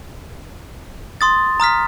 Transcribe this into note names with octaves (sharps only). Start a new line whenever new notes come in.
C6 D#6 A6
A#5 D#6 F6 B6